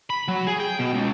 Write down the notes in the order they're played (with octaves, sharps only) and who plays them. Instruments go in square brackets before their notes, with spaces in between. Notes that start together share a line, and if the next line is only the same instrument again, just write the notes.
[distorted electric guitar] B5
F#3
G#4
G5
B2
C#2